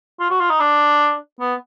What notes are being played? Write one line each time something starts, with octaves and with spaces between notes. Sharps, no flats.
F4
F#4
F4
D#4
D4
B3